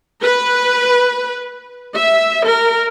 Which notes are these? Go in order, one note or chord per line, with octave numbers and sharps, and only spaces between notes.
B4
E5
A#4